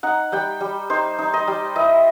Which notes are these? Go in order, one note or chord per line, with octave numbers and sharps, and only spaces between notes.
D#4 F#5
G3 G5
G3
D#4 C5
D#4
D#5
G3
E4 D#5